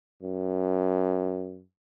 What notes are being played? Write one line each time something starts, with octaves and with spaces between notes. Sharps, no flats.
F#2